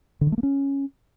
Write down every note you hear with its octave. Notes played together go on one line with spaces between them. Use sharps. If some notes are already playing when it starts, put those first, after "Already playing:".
D3
D#3
A3
A#3
C#4